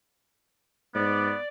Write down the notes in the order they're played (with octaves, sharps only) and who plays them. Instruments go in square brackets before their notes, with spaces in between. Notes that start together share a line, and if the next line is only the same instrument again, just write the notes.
[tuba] G#2 [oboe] B3 [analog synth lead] D5